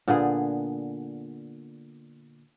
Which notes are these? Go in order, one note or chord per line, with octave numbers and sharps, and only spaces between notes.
A#2 D3 B3 G#4